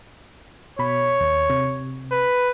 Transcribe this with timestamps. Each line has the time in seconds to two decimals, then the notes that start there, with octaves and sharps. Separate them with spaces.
0.79 B2 C#5 B5
1.21 D#2
1.50 C3
2.12 B4